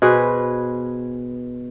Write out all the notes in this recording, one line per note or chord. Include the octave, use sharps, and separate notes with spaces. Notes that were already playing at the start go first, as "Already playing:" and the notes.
B2 G#4 B4 C5